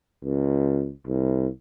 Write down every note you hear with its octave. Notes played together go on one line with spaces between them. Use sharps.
C#2
C2